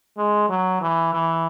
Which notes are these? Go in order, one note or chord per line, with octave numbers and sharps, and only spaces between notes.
G#3
F#3
E3
E3